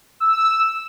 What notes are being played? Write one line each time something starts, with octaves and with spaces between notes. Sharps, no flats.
E6